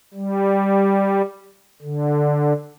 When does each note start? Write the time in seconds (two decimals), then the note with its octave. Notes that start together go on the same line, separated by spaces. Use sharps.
0.14 G3
1.82 D3